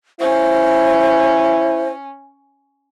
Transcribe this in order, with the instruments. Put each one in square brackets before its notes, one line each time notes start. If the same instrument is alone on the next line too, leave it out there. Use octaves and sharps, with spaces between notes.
[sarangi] C#4 [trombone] E4 [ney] C5